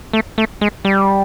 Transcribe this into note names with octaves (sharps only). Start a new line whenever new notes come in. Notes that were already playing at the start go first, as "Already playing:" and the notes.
A3
A3
G#3
G3